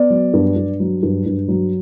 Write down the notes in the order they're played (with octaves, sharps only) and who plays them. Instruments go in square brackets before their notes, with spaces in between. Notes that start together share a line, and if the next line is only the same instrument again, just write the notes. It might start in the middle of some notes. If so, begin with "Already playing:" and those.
Already playing: [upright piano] B3 D5
F#3
G2
G2
F#3
G2
G2
F#3